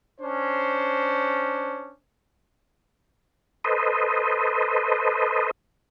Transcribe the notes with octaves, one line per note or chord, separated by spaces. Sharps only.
C#4 D4 C5
A4 B4 C5 D#5